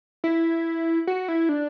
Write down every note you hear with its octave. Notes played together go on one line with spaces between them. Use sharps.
E4
F#4
E4
D4